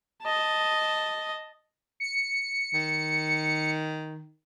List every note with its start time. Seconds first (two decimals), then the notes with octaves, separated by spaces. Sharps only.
0.23 D#5 A5
2.00 C#7
2.74 D#3